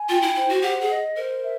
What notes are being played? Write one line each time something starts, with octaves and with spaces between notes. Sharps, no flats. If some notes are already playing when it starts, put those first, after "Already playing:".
Already playing: G#5
F4 G5
E4
E4 C5
F#4
G4 F#5
G#4
D#5
A#4 C5
E5